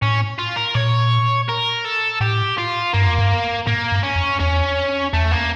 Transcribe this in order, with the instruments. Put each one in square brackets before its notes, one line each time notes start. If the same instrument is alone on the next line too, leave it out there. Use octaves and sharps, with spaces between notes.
[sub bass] A2 [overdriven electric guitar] C#4
[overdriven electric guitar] F4
A#4
[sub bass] A#2 [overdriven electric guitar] C#5
[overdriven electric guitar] A#4
A4
[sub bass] A2 [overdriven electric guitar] G4
[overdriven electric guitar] F4
[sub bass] G2 [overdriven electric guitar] A#3
[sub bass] F2
G2
[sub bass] A2 [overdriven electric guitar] A#3
[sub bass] G2
[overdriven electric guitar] C#4
[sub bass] F2
[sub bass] E2 [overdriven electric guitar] C#4
[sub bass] E2 [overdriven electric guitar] A3
[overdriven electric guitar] A#3